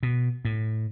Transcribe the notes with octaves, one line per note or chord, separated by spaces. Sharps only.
B2
A2